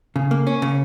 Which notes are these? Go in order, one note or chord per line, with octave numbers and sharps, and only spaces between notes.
C#3
A#3
C#4
C#3